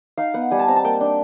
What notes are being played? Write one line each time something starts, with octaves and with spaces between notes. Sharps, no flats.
D#4 F5
B3 F#5
G3 G#5
A5
C4 A#5
A5
A#3 G5
D4